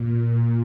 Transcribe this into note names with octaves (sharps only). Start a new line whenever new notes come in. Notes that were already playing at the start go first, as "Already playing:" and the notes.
Already playing: A#2